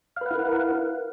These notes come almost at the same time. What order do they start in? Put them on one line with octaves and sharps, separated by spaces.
F5 B4 F#5 E4 A#4